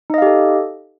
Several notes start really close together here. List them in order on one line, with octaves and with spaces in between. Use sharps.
D#4 D#5 F5 G4 A4